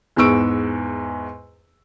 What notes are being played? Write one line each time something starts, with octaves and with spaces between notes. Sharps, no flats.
E2 G#2 B3 C#6 E6 D7